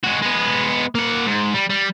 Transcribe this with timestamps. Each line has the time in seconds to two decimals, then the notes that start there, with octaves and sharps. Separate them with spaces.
0.04 G#3 F#4
0.22 G#3 B3
0.95 A#3 F#5
1.26 G#2
1.54 G3
1.70 G3